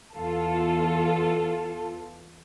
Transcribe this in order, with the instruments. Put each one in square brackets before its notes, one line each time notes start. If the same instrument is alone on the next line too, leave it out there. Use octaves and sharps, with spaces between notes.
[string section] E2 F4 A4